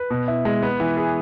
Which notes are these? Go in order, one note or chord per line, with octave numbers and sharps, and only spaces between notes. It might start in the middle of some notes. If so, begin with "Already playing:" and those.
Already playing: B4
B2
E4
G#3
B3
E3
G#4